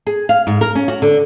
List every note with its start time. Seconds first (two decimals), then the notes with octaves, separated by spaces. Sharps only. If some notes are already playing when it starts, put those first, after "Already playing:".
0.07 G#4
0.29 F5
0.47 G#2
0.61 A#4
0.75 C#4
0.88 F#4
1.02 D3